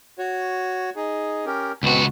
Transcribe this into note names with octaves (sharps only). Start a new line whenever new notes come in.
F#4 C#5
D#4 G#4
C#4 G4 A#4
C#2 B2 B3 C4 F#4